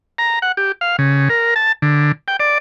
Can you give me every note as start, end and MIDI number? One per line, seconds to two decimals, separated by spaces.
0.18 0.39 82
0.42 0.52 78
0.57 0.72 67
0.81 0.96 77
0.99 1.29 49
1.29 1.54 70
1.56 1.72 81
1.82 2.12 50
2.28 2.37 79
2.40 2.58 74